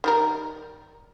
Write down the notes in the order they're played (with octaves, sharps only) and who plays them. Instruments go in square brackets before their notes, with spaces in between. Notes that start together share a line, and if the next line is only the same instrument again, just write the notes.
[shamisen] D#3 G3 A#4